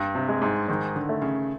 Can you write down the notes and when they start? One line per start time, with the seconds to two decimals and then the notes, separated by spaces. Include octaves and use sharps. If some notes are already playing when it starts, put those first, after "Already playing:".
Already playing: G2
0.15 C3
0.29 G#3
0.42 G#2
0.68 G#2 D#3
0.96 D3
1.09 A3
1.22 C#3